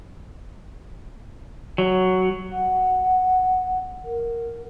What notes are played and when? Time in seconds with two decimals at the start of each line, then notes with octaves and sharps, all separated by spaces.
1.78 F#3
2.52 F#5
4.04 A#4